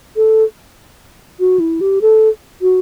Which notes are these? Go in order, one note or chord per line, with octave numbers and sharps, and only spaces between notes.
A4
F#4
E4
G4
A4
F#4